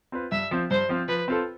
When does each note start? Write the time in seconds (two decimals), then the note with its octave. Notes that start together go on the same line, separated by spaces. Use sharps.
0.12 C4 F4 B4
0.32 G2 E5
0.51 F3 C4 F4
0.71 G2 C5
0.89 F3 C4 F4
1.08 F3 B4
1.28 C4 F4 A4